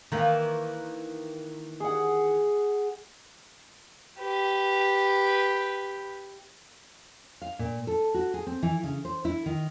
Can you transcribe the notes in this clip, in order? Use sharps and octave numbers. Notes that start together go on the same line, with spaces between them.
D#3 E3 A#3
G#4 F#5
G4 B4
F5
A#2
A4
F#4
G#4
C4
E3
C#3
C5
E4
D#3